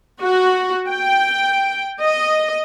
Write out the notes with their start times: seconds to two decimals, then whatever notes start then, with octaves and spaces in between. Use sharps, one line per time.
0.23 F#4
0.89 G5
2.02 D#5